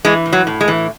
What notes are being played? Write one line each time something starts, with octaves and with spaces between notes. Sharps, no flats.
E3 G#3
A2
F#3
A2
G#3
E3